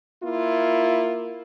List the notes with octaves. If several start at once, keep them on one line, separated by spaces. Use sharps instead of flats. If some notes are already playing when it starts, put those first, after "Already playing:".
A#3 E4 F4